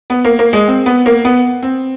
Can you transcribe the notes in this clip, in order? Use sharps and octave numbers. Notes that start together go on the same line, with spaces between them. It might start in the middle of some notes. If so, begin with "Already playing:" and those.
B3
A#3
A#3
G#3
C4
B3
A#3
B3
C4